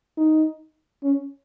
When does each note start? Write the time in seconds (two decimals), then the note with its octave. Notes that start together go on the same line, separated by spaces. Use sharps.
0.17 D#4
1.03 C#4